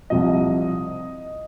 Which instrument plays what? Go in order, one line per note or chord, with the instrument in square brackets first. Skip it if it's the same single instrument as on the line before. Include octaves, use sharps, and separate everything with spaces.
[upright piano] C2 C3 F3 D#5